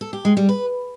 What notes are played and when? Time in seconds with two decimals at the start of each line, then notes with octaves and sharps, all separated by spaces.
0.01 A4
0.13 G4
0.25 G#3
0.37 G3
0.49 B4